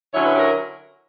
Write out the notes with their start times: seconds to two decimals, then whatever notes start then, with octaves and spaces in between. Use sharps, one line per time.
0.13 D3 F#3 C#4 E4 C#5
0.26 B4
0.36 G4
0.40 A#4